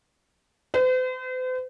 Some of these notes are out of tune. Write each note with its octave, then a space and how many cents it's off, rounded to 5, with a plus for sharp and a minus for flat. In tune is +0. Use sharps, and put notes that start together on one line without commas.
C5 -45